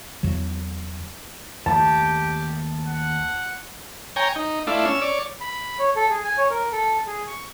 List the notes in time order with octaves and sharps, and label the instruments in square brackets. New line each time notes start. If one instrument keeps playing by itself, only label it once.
[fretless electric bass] E2 D3 F#3
[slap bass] D#2 A3 [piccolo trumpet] G4 [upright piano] A5
[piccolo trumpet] F#5
[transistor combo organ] C#5 G5 G#5 A#5
D#4
A3 D4 E4 F4
C#4 E6
C#5 D5
[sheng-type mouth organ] B5
C#5
A4
G#4
G#5
C#5
A#4
A4
G#4
C#6